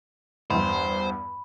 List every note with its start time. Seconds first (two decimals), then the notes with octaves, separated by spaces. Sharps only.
0.50 E2 G2 C5 B5